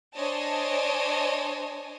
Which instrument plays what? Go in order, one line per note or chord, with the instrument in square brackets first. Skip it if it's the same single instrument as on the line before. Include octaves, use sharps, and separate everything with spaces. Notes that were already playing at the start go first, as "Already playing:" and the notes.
[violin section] D4 C5 C#5 D#5 G#5 A5